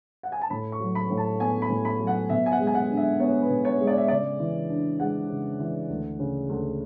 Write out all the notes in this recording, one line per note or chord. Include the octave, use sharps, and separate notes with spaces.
F#5
G#5
A5
A2 B5
C#6
F#3
B5
A2
A5
B3 G#5
B5
A2
B5
F#3
F#5
B2 E5
G#5
F#5
G#3
G#5
F#5
D4
E5
B3 C#5
B4
B2
C#5
G#3
D5
E5
C#3 D5
E3
D4
G#3 F#5
C#3
E3
D2
C#3
D2